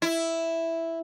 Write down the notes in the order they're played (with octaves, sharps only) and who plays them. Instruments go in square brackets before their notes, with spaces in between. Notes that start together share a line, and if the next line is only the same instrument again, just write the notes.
[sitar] E4